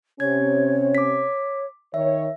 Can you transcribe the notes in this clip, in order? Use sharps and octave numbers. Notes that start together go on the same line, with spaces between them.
C3 C#4 C#5 G#6
D6 B6
D#3 C#5 E5